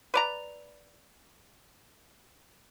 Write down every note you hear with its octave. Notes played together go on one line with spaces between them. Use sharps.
B4 D5 A#5